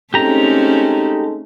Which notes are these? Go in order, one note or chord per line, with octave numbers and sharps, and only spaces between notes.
G#3 A3 C4 C#4 D#4 G4 A4 A#5